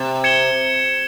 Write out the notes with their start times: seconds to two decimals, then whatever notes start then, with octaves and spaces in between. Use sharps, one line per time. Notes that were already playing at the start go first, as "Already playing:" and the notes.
Already playing: C3
0.24 G#6 C#7 E7 G7